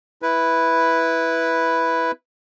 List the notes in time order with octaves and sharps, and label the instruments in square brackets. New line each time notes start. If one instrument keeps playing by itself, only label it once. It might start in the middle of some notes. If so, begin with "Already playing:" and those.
[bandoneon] E4 B4